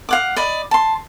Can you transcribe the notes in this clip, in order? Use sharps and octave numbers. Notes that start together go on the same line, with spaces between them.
F5 F#5 D6
D5 D#5 B5
A5 C6